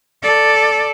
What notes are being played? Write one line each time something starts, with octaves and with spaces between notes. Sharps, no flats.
A4 D5